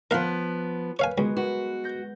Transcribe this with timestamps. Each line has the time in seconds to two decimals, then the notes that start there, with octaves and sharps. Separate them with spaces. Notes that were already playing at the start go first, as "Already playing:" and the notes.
0.11 F3 B3 A#4 F5 F#6
0.99 B4 C#5 F5 G#5
1.18 C#2 G#3 B3 F#4
1.37 F#4 B4
1.84 G6 A#6